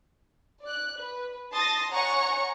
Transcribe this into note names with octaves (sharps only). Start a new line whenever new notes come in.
D5 F#6
B4
A5 C6 D#6 A6 A#6
C#5 F#5 G#5 A#5 C#6 C#7